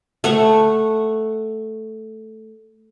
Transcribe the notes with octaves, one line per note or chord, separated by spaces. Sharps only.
A3 F#5 C#6